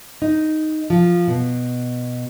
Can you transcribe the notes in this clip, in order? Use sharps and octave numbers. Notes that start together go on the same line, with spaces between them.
D#4
F3
B2